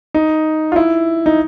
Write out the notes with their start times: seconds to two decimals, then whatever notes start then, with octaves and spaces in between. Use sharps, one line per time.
0.14 D#4
0.72 F4
0.76 E4
1.26 D#4